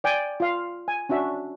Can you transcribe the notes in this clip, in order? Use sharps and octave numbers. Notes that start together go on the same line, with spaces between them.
D5 G5 G#5
F4 F5
G#5
C#4 D4 F#4 E5